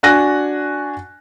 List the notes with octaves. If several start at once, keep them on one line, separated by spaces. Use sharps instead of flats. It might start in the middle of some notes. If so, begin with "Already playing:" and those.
D4 F#4 G#5 F#6 A#6